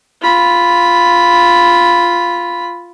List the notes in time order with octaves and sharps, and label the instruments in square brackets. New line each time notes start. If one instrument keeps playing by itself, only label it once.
[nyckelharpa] F4 B5